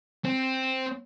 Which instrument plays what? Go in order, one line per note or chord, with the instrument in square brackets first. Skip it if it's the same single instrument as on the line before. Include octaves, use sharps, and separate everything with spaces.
[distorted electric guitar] C4